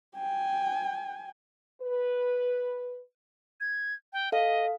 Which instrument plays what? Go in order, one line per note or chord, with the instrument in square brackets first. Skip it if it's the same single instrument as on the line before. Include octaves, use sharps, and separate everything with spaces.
[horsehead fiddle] G5 G#5
[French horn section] B4
[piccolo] G#6
G5
[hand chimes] A4 F5 [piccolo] D#5